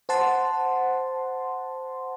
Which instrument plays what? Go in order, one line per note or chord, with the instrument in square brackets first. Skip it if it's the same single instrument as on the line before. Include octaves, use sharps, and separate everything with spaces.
[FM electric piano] C5 F#5 A5 C6